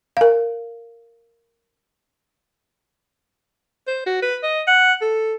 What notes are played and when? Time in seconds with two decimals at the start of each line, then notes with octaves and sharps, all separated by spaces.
0.17 A#4 F5
3.87 C5
4.06 F#4
4.22 B4
4.43 D#5
4.68 F#5
5.01 A4